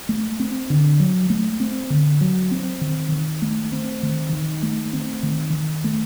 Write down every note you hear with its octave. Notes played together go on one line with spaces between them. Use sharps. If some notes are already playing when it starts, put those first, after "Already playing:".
A3
C4
D3
F#3
A3
C4
D3
F#3
C4
D#3
D#3
A3
C4
D#3
D#3
A3
C4
D#3
D#3
A3